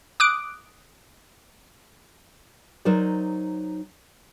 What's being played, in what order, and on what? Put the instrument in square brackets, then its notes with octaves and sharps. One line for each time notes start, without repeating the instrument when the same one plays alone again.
[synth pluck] D6 D#6 F#6 D7
[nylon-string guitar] F#3 D#4 A#4 C5 D5